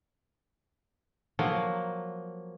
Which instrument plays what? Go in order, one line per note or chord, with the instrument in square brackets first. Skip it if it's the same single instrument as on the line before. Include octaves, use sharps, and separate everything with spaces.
[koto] F3 F#3 A#3